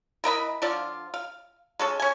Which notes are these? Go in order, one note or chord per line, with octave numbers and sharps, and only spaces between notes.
E3 A#4 D#5 B5
D3 F3 F4 D5
F5
G#3 C#4 A4
C#4 G#5